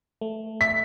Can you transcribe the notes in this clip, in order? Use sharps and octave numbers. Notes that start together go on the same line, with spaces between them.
A3
E5 B6